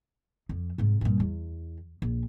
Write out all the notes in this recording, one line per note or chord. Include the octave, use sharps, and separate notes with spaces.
F2
G#2 C3
G2 A#2
E2
A#1